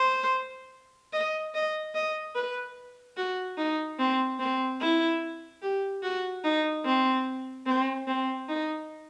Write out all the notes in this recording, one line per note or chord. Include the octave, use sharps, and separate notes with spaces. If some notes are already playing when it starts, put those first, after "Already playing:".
Already playing: C5
D#5
D#5
D#5
B4
F#4
D#4
C4
C4
E4
G4
F#4
D#4
C4
C4
C4
D#4